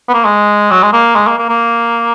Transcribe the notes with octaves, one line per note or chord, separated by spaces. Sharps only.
B3
A#3
G#3
F#3
G#3
A#3
G#3
A#3
A#3
A#3